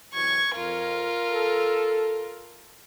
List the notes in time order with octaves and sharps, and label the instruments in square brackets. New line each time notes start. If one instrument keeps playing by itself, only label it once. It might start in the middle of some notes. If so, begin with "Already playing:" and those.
[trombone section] C3 E3 F#3 [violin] C#6 G#6
[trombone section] F2 [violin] F4 A#4
[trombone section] A4